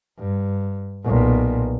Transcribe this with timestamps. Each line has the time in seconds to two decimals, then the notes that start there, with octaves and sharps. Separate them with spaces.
0.19 G2
1.04 B1 A#2